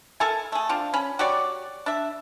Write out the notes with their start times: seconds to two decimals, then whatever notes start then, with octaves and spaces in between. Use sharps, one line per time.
0.20 A4 A#4 E5 G#5
0.52 A3 G#4
0.69 C4 D4 F4
0.94 C#4 B5
1.19 F#4 G4 C#5 D5
1.86 D4 E5